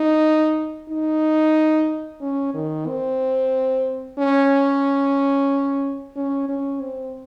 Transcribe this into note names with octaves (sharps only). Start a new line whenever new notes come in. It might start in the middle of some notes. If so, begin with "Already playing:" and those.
Already playing: D#4
D#4
C#4
D#3
C4
C#4
C#4
C#4
C4